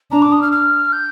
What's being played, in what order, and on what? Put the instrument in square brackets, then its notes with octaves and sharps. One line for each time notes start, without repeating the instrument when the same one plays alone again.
[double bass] D4 [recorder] A#5
[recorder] D6
D#6
F6
F6
G6